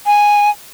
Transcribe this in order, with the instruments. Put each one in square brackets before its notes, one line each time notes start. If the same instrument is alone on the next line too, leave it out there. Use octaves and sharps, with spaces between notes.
[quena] G#5